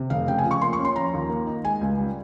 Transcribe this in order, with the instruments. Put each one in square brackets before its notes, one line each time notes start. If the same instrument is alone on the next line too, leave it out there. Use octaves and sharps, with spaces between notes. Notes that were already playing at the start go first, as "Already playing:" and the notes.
Already playing: [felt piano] C3
F1 F5
C#3 G5
G#5
F3
C#6
A#3 C6
C#6
C#4
C6
F3 A#5
D#2
A#3
D#4
G#3 G#5
C#2
G3